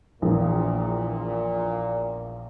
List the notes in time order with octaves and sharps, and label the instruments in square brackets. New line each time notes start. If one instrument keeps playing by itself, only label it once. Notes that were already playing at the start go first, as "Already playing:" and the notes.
[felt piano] A#1 E2 [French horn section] A#2